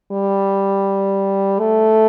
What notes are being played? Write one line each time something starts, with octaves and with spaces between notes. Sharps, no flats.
G3
A3